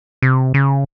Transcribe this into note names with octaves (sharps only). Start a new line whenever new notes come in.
C3
C#3